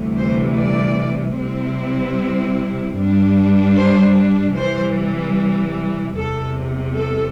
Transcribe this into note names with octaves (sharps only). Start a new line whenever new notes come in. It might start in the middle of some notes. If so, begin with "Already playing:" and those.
Already playing: D2 C3 E3 G3
C5
D5
C3 G3 C4 E4
G2 G3 D4
C5
C3 E3 G3 C5
E2 C3 G3 A4
A4